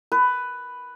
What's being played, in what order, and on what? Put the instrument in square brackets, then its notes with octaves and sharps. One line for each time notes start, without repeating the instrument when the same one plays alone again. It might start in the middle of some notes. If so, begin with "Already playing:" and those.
[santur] B4